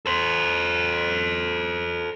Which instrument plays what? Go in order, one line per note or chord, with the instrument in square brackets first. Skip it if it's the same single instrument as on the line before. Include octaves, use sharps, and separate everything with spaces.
[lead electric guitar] A4 C5